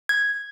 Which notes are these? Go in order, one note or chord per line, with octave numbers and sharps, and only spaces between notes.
G#6